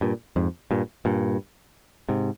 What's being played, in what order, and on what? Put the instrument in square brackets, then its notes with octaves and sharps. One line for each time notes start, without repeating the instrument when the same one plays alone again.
[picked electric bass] G2 A#2
F2 G#2
G2 A#2
G2 A#2
G#2 C3